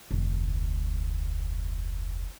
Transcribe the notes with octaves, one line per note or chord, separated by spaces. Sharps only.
F1 D2